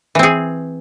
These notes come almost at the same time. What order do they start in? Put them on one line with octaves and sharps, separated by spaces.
E3 C4 G#4